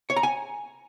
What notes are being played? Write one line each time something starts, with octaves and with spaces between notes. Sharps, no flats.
C#5
A#5
G#5